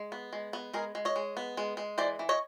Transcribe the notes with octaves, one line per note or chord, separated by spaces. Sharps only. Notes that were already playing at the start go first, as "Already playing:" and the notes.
Already playing: G#3
B3
G#3
B3
G#3 G#4 A#4
G#3
C#5 D#5
G#3
B3
G#3
G#3
E3 C5 D5
E3
C#5 D#5